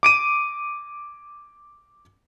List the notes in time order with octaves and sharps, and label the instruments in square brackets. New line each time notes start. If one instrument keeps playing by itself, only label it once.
[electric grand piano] D6 D7 D#7